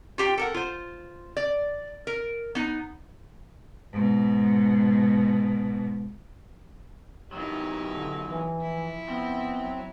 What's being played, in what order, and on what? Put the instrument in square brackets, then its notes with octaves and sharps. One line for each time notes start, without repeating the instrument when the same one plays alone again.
[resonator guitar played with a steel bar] F4 G4 G5
A4 A#4 F#5
F4 C5
D5
A#4
B3 D#4
[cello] G#2 B2
[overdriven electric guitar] D#3 F#3 [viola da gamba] D#4 E4 G4
[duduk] D3
E3
[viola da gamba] F3 E4
[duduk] B3 [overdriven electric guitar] C4
[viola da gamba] F#3 E4